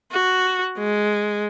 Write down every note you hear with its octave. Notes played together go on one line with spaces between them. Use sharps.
F#4
G#3